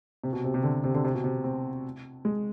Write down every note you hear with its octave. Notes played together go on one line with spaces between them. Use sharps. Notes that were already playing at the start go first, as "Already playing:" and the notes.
C3
B2
C3
C3
D3
C3
D3
C3
B2
C3
C4
G#3